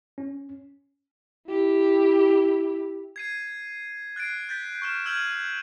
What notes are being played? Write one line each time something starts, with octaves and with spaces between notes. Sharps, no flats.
C#4
E4 G4
G#6 C7 D#7
F#6 A6 C7 D7
G6 A6 B6
C#6 F6 E7
E6 F6 G6 G#6 D#7 F#7